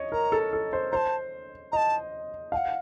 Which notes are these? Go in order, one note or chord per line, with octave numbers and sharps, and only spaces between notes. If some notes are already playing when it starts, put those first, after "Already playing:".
Already playing: C#5 D#5
A#4 A#5
A4
A4
C5
C5 A5 A#5
D#5 A5 A#5
F5 F#5 A5